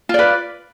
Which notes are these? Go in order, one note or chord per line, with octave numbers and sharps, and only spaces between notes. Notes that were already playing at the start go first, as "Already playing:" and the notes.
F4 B4 D5